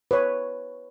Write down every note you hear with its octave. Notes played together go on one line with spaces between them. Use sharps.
B4 C#5